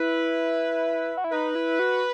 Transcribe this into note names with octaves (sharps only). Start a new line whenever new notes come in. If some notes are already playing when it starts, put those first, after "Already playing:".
Already playing: E4 B4
F#4
E4
D#4 B4
E4
F#4